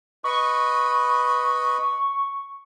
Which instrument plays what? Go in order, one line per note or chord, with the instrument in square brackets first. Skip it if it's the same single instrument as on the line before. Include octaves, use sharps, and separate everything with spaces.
[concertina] B4 D#5 B5 [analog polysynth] C#6